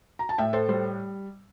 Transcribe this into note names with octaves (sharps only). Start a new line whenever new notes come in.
A#5
A5
A2 E5 G5
A4 C5
G3 A4 C5